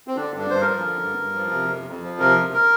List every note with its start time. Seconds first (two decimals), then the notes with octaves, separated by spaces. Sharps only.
0.08 C4
0.17 D3 D4
0.34 G2
0.39 D4
0.50 G2 C5
0.61 A#4
0.68 F3
0.85 D3
1.01 G2
1.18 G2
1.35 F3
1.52 C3
1.69 F2
1.86 F2
2.03 F3
2.19 C3 A#4
2.37 F2
2.53 A#4